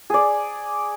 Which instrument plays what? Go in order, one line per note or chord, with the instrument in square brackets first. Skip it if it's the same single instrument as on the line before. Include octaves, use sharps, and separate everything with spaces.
[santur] G#4 D5